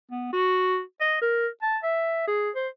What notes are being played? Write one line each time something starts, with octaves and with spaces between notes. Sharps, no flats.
B3
F#4
D#5
A#4
A5
E5
G#4
C5